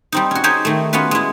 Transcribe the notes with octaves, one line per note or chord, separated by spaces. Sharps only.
G3 C4 D#4
C#4 F#4
D#4 G4 G#4 C5 C#5
D#3 A3
B3 C#4 F4 F#4 B4
G#3 E4